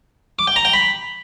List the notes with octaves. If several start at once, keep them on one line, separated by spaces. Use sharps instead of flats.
D6
G5
A#5
G5
B5